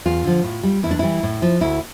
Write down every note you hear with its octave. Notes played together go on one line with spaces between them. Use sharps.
E2 F4
D3 F3
A2
G3
E2 E4
D4
E3 G3 E4
A2
F3
D2 E4